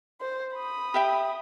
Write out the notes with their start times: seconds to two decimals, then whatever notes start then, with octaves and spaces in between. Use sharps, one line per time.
0.21 C5
0.55 B5 D#6
0.94 G4 E5 G5